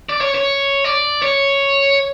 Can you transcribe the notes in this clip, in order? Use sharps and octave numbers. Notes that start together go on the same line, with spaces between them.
D5
C#5
C#5
D5
C#5